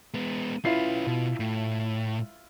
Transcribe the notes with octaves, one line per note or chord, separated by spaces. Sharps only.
G#3 B3
C#4 E4 F4 B4 C7
B2
A2